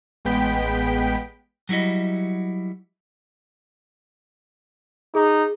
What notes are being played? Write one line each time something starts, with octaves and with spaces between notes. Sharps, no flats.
A1 G#3 B3 G5 B6
F#3 G3 E4 F#4 D#5
D#4 G#4